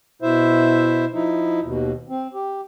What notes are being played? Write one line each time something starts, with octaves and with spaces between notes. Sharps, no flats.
B2 E4 C5 E5
F3 D#4 E4
D#2 B2
C4
G4